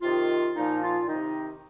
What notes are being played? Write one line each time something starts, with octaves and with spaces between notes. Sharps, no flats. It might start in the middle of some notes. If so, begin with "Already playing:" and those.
C3 D#3 F4
A#2 F3 D#4
F4
C3 D#3 D#4